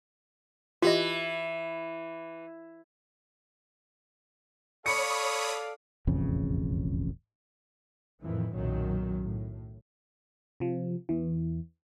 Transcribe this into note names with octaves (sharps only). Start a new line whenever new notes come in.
E3 F4 G4 D#5
A4 C#5 D5 F5 B5 C#6 D#6 C#7
E1 A1 F2 C#3
F2 A2 D#3 E3
B1 F#2 A#2 D#3 F#3
A2
C3 F3
E2 E3